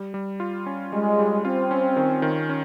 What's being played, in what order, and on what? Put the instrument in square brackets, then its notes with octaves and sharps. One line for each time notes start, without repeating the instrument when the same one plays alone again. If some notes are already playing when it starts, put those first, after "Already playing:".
Already playing: [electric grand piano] G3
G3
F4
C#4
[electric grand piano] G3 [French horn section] G#3
[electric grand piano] G3
[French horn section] C4 [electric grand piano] F4
[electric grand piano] C#4
D#3
D#3
C#4